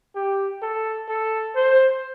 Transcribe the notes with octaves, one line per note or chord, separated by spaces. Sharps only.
G4
A4
A4
C5